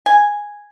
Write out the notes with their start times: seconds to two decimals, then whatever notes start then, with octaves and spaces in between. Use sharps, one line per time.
0.06 G#5